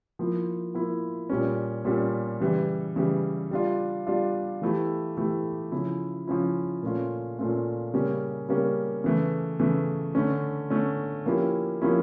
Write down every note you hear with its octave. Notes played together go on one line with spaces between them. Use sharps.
F3 A#3 E4
F3 A#3 E4
A#2 G3 C#4
A#2 G3 C#4
C#3 E3 G3
C#3 E3 G3
G3 D4 F4
G3 D4 F4
E3 A3 E4 G4
E3 A3 E4 G4
C#3 F3 C#4 E4
C#3 F3 C#4 E4
A#2 A3 C#4 F4
A#2 A3 C#4 F4
C#3 G3 A#3 C#4
C#3 G3 A#3 C#4
C#3 E3 A3
C#3 E3 A3
D3 A3 C#4
D3 A3 C#4
F3 A#3 C#4 E4 G4
F3 A#3 C#4 E4 G4